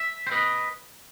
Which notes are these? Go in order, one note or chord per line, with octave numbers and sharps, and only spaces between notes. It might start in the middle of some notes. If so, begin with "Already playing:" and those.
Already playing: E5
C5
B4 D#5